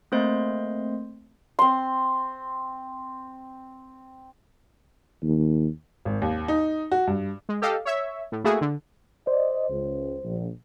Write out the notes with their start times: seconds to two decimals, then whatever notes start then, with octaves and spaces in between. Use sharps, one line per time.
0.12 A3 A#3 C4 C5 D#5 C6
1.59 C4 C6
5.23 D#2
6.05 G#1
6.22 D#2
6.48 D#4
6.92 F#4
7.07 G2
7.49 G#3
7.62 G4 A4 D#5 F5
7.85 C#5 E5
8.32 A2
8.44 A3 A#3 E4 F#4 G#4
8.61 D3
9.27 C5 D5 D#5
9.70 C#2
10.24 A#1